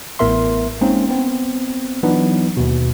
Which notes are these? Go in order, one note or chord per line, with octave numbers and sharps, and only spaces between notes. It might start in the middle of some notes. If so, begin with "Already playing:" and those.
A1 A2 B3 A#4 E5 C6
G#3 A#3 C4 C#4 D#4
B3 C4
E3 F#3 B3 D4 D#4
D#2 B2